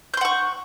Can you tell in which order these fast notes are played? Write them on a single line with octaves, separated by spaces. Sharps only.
G6 C6 F#5 C#6